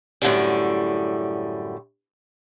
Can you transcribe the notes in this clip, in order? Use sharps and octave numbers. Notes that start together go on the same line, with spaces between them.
F#2 A2 D3 G3